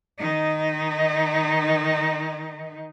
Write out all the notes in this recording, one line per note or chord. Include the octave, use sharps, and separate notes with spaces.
D#3 D#4